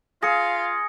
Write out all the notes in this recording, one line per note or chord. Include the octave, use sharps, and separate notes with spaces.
F4 G#4 F5 A#6 C#7